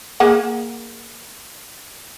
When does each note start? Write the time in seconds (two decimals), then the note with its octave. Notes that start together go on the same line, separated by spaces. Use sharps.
0.20 A#3 G#4 F#5